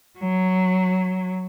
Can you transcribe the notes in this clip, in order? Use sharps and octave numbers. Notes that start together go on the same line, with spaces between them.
F#3